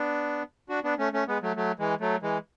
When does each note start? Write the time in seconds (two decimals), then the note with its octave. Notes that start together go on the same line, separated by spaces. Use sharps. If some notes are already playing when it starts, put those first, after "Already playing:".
Already playing: B3 D4
0.69 D4 F#4
0.84 B3 D4
0.98 A3 C#4
1.13 A3 C#4
1.28 G#3 B3
1.42 F#3 A3
1.56 F#3 A3
1.79 E3 G#3
2.01 F#3 A3
2.22 E3 G#3